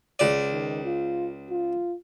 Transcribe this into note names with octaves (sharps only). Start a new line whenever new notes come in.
C#2 D5
D#3
F4
F4